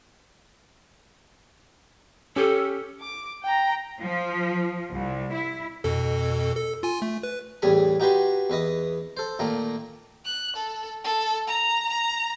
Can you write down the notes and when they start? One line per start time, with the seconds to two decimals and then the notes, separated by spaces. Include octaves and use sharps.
2.36 C#4 G4 A4
3.01 D6
3.44 G5 A#5
4.01 F3
4.94 C2
5.35 E4
5.84 F2 B2 A4
6.56 A4
6.83 F4 G#5
7.02 A3
7.23 B4
7.62 E2 A2 G3 G#4 G#5 B5
8.00 D#4 F#4 G4 B4 G#5 C6
8.50 E2 B4 D#5 D#6
9.17 A4 C5
9.39 A#2 D#3 A3 A#3
10.25 F#6
10.56 A4
11.04 A4
11.47 A#5
11.89 A#5